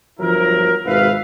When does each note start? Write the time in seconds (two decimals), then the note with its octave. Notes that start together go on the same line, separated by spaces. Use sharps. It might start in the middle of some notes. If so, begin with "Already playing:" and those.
0.20 G1 F3 F#3 E4 A#4
0.85 G#1 G#2 B2 B4 E5 F5